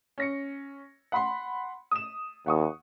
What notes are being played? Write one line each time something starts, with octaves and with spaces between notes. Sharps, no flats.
C#4 A#6 C#7
F#5 B5 C6
D#6 E7
D#2 F#5 C#6 D#6